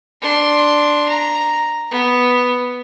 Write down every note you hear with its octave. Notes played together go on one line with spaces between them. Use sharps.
D4 C6
A#5
B3